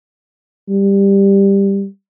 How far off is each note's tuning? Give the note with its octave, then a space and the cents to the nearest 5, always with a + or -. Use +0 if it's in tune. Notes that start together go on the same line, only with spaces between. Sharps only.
G3 +10